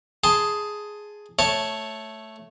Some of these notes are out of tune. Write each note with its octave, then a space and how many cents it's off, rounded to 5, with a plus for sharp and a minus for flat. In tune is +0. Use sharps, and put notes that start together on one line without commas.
G#4 +5 A5 +0 C6 +0
A3 +0 C#5 +0 A5 +0